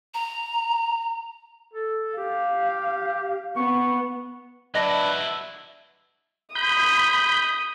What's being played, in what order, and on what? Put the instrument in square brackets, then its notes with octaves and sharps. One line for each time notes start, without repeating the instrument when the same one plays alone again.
[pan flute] A#5
[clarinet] A4
[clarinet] G4 [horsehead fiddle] F5
[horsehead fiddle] B3 [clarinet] C#6
[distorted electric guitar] F#3 E4 [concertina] D4 B4 D5 [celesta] D#5 A#6
[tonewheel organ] B5 G6 [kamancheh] D#6